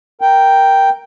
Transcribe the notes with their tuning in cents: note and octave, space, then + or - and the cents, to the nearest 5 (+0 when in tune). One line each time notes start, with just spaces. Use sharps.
A#4 +0 G5 +0